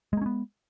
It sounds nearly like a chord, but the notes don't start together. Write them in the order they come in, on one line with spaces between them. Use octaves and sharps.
G#3 A#3 C#4 B3